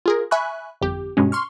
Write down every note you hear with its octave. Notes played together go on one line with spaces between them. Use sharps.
F4 G#4 A#4
E5 G#5 B5 C#6 F#6
G1 F2 G4
G2 B2 G#3 C#4
C6 C#6 F6